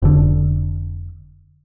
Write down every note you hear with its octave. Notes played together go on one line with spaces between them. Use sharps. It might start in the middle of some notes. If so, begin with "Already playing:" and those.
F1 D3